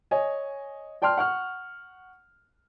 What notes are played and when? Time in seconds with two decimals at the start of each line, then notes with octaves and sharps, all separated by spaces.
0.11 C#5 D#5 G#5
1.02 D5 G5 A5 C6 F6
1.18 F#5 C#6 F6